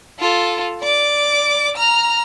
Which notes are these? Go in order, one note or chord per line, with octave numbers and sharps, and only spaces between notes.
F4 A4
D5 D6
A#5 F6